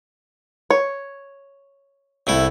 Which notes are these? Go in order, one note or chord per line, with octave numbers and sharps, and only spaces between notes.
C#5
C2 A3 E4